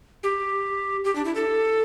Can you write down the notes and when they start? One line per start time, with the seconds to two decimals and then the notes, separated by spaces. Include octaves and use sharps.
0.23 G4
1.05 G4
1.16 D4
1.25 E4
1.35 A4